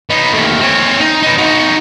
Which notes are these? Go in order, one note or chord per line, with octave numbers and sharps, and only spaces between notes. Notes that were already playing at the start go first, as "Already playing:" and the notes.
B3 D#4
D#2 A3
C4 C#5
D#4
D#4 B4
D#4 F#4